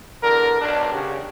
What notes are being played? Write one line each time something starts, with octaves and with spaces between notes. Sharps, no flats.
E2 D3 A#4
B1 D4
C#3 F#4 G4